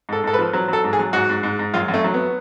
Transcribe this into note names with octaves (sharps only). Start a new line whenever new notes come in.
G#2 A4
G#2 A4
B4
F3
F#3
F#3 A4
G#2
G#4
F#3
G#2 F#4
G#2
G#2
G#2
F#2 F4
F#2
A3
F#3
B3